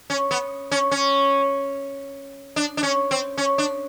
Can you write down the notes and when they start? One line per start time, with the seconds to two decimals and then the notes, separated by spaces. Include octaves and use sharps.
0.10 C#4
0.31 B3
0.71 C#4
0.91 C#4
2.56 D4
2.77 D4
2.83 C#4
3.11 C4
3.37 C#4
3.58 D4